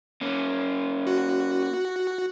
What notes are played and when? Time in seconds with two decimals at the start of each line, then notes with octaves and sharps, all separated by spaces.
0.21 A#3 C#4
1.07 F#4